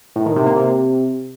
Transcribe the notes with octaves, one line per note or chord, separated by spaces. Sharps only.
A2
D#3
C3
A#3
C3